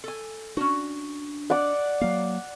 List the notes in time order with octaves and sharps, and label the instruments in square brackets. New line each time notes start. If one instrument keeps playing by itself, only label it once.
[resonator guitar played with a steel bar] A4 G#5
[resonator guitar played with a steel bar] C#4 F#4 [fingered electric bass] D4
[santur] D5 F#5
[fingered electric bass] F#3 A#3 [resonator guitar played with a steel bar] F5